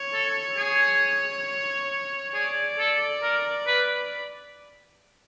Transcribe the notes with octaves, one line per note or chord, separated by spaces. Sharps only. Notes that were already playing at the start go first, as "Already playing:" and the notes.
Already playing: C#5
A4
G#4
G#4 D5
A4
A#4
B4